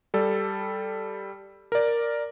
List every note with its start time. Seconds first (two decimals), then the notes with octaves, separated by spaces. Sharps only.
0.14 G3 A4
1.72 A#4 D5